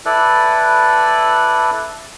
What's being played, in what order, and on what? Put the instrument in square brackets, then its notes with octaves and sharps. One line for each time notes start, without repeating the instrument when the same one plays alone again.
[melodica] E4 A4 B4 D5